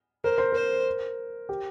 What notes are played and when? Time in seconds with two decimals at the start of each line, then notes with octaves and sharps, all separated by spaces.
0.24 A#4 C5
0.38 C5
0.52 A#4 C5
1.49 G4